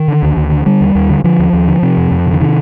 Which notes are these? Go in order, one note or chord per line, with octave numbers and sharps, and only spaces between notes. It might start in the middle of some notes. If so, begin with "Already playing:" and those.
Already playing: D#3
D3
D2
D2
D3
D3 G3
D#2
D#2
D3
D3 F3
D#2
D#2
D3
C3
F2
F2
C3
D3
C3 D#3